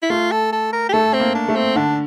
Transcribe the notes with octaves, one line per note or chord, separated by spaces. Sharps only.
E4
A3 F4
A4
A4
A#4
G4
A3 A4
C4
A#3
D4
A3
C4
D3 D4